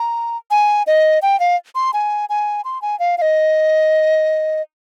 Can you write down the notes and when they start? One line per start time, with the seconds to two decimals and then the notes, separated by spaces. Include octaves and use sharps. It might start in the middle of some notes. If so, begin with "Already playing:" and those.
Already playing: A#5
0.51 G#5
0.87 D#5
1.22 G5
1.40 F5
1.75 C6
1.93 G#5
2.29 G#5
2.65 C6
2.82 G#5
2.99 F5
3.18 F5
3.22 D#5